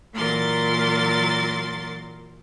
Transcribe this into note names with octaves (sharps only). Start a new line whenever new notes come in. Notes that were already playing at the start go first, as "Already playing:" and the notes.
A#2 E3 F#3 A#4 C6 A6